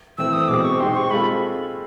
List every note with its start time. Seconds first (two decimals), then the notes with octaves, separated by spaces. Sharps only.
0.18 E3 A3 C4 E6
0.33 D#6
0.48 B2 G#3 C4 D6
0.64 C#6
0.80 G#3 C4 D#4 G4 C6
0.96 C#6
1.10 G#3 C4 F4 A4 B5